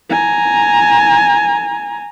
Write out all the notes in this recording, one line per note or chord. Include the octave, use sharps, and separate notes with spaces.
G#5 A#5